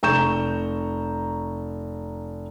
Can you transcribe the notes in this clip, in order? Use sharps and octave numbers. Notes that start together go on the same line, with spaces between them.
F1 A#5 C#6 G6 E7